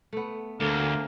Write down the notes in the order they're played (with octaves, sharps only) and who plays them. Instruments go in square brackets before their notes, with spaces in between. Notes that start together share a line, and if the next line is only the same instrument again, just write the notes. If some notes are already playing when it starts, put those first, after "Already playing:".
[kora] A3 B3
[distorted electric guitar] D2 [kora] A3 [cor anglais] A#3